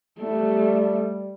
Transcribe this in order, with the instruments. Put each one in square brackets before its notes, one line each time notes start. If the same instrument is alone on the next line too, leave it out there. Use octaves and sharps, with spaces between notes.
[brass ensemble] G3 [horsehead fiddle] A3